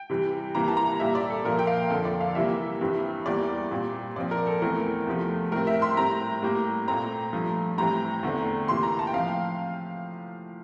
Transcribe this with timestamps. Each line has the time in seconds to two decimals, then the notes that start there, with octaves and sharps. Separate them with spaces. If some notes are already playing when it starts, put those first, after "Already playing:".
Already playing: G5
0.10 C3 E3 G3
0.55 C3 E3 G3 A#3 A#5
0.68 A5
0.77 A#5
0.99 A#2 G3 A#3 E5
1.15 D5
1.30 A4
1.45 A#2 F3 A#3 A#4
1.59 G5
1.67 F5
1.90 F2 D3 F3 A4
2.05 D5
2.21 F5
2.35 C3 E3 G3 A#3 E5
2.81 G2 E3 G3 C4
3.26 E2 E3 G3 A#3 D5
3.71 A#2 G3 C4
4.16 A#2 F3 C4 D5
4.31 A#4
4.47 A4
4.62 E2 E3 A3 C4 A#4
5.07 E2 C3 F3 A3
5.52 A2 G3 C4 A#4
5.67 E5
5.82 C6
5.97 A2 G3 C4 A#5
6.42 A2 G3 A#3
6.88 A#2 A3 C4 A#5
7.33 G2 F3 A3
7.78 A2 E3 G3 C4 A#5
8.23 E2 D3 A3 C4
8.68 C3 E3 A#3 C6
8.83 A#5
8.99 A5
9.07 G5
9.14 A2 F3 C4 F5